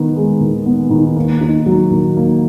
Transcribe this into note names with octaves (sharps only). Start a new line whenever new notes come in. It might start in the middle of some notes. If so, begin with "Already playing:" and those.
Already playing: D#3 B3
G#3
D#3
B3
D#3
A#3
D#4
F#3
D#3
A#3